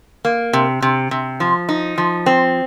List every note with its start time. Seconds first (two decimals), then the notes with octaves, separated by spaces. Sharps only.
0.25 A#3
0.53 C3
0.82 C3
1.11 C3
1.40 F3
1.69 D#4
1.98 F3
2.26 C4